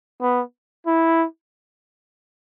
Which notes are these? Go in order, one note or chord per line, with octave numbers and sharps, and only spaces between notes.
B3
E4